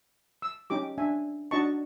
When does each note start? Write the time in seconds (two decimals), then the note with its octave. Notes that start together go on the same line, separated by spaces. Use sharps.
0.42 E6
0.70 C#4 D#4 G4 D6
0.98 D4 E5 G#5
1.51 D4 D#4 F#4 D#5 A5 C#6